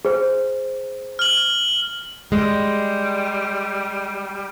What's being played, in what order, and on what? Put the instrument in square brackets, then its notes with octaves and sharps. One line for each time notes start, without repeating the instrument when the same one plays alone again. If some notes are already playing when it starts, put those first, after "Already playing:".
[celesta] G#4 C5
[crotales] F6 F#7
[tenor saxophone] G3 [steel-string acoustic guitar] G#3